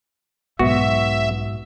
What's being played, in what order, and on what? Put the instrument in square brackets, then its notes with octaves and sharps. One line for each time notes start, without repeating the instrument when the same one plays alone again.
[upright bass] B1 [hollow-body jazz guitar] G#2 B3 [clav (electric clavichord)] F#4 [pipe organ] E5